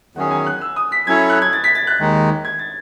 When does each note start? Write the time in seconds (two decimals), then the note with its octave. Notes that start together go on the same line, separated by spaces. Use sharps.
0.15 E2 D#3 F#3 C#4 G#4 F#5
0.31 G#5
0.47 F#6
0.61 E6
0.76 D#6
0.92 B6
1.07 F#3 C#4 E4 A4 C#5 G#6
1.30 F#6
1.42 G#6
1.53 A6
1.64 B6
1.75 A6
1.87 F#6
1.99 D#2 D#3 G#3 D#4
2.45 G#6
2.59 A6